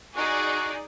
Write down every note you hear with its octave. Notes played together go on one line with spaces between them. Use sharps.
D#4 F#4 G#4 D5